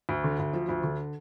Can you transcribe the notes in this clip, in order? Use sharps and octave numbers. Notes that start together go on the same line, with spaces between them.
D2
D3
D2
F3
D2
D3